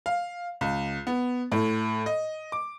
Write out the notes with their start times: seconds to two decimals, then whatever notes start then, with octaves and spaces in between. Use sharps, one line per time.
0.06 F5
0.61 C#2
1.07 B3
1.52 A2
2.06 D#5
2.52 D6